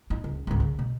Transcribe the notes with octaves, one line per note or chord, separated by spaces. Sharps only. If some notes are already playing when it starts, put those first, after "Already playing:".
A1 D#4
C#2
G#1 C#2
C#3
B2